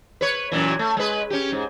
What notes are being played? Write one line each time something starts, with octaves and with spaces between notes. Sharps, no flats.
B4 C#5
F#2 A#2 E3
A3
G#3 B4
C#4 G4
G#2